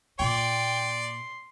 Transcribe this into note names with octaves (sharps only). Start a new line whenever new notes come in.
A#2 A#3 D5 G5 C6